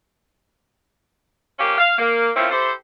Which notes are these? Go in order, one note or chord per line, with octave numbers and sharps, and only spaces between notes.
F2 A#3 C#4 G4 F5
F5
A#3
A3 A#3 C4 C#4 E4 F4
E4 G4 A4 C5